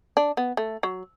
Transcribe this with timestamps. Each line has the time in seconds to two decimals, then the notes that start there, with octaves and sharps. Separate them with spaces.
0.17 D4
0.37 B3
0.57 A3
0.83 F#3